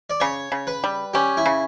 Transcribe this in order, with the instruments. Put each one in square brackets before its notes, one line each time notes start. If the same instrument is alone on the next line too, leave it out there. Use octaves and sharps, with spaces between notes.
[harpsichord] D5
[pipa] C#3 [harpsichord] C#5
[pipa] C#3
[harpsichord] B4
[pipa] G3
[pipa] C#4 [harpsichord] G4
[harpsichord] E4
[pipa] C#3